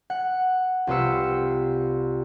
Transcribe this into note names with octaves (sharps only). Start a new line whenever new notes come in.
F#5
C2 F4 B4 C5 E6 C#7